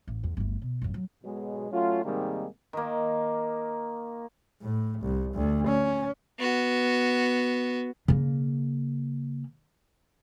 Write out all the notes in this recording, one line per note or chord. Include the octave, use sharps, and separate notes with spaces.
A1
E2
G1 D2
B2
G#1 F#2
F#3
B1 G#2 B2 F#3 G#3
F#3 A3 C#4 F4
G#2 C3 D#3 G3 G#3 A#3
D#3 A#3
A2
C2
D2
C#4
B3 F#4
C#3 A#3